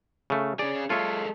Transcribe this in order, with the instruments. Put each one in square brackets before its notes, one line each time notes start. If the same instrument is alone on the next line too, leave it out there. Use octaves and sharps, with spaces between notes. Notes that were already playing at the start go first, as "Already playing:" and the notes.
[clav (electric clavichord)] C#3 A3
[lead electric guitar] C#4 G#4 [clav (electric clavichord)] D5
[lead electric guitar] G#3 A4 [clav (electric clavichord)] F4 C#5 E5